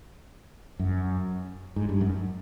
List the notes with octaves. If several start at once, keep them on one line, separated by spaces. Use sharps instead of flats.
F#2
G#2
G2
F#2